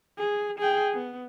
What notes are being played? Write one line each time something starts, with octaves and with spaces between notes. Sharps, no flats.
G#4
G#4 G5
B3